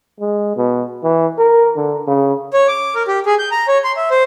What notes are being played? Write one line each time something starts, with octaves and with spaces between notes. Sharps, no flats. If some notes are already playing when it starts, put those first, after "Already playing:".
G#3
B2
E3
A#4
D3
C#3
C#5
D6
A#4
G4
G#4
G6
A#5
C#5
C6
E5
C5